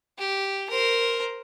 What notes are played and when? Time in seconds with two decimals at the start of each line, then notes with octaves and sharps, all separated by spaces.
0.18 G4
0.70 A#4 C5